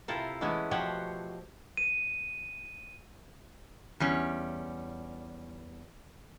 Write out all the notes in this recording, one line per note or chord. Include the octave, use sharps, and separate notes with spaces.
C3 E4 F4 A4 A#4 C5
E3 G#3 A3 B3 C#4 E4
B2 F3 G4 C5 C#5 F#5
D#7
E2 G3 C#4